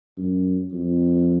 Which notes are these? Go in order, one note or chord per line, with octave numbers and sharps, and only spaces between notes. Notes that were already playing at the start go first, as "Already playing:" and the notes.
F#2
F2